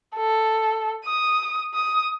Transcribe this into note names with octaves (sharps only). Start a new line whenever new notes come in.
A4
D#6
D#6